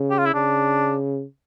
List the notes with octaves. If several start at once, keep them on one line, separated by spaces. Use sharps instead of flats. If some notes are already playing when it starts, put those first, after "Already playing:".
Already playing: C#3
G4
F4
E4
C#3 D4